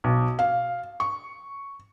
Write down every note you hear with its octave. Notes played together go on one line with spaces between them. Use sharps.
B1
F5
C#6